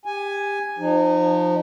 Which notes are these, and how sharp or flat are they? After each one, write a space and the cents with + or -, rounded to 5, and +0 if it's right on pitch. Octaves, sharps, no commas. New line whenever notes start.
G4 +25 G#5 +0
F3 +10 D#4 -30